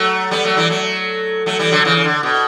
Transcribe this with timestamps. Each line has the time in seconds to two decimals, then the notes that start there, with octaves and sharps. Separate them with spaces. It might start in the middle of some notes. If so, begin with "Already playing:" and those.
Already playing: F#3 A3
0.31 G3 B3
0.45 F#3 A3
0.57 E3 G3
0.70 F#3 A3
1.46 F#3 A3
1.59 E3 G3
1.71 D3 F#3
1.85 C#3 E3
1.97 C#3
2.04 D3
2.23 B2